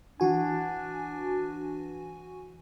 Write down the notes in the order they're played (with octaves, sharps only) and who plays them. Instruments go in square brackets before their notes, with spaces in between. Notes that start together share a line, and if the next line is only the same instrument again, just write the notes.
[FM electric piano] E3 F#4 G#5 [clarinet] D4